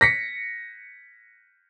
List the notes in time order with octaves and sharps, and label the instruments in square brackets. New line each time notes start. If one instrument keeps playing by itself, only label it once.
[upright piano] A#6 B6 C#7